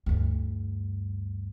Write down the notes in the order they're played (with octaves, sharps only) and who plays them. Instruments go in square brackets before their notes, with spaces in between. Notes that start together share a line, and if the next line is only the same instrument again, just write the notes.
[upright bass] D2 G2